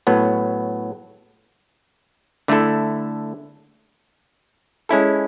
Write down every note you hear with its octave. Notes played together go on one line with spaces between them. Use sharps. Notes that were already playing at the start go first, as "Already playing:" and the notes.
A2 F#3 B3
D3 A3 E4 A4
G#3 C#4 E4 A4